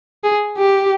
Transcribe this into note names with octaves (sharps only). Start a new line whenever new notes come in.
G#4
G4